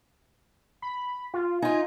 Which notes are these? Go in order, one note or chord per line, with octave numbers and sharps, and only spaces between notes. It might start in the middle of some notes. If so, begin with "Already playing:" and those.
B5
F4
D#4 F4 G#5